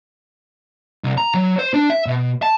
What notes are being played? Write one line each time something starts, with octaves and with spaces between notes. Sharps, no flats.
C2
A#5
F#3
C5
D4
E5
B2
A5